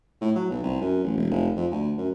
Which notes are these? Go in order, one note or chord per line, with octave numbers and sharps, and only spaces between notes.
A2
F#3
B1
C2
F#2
A1
E1
F1
F2
D2
F#2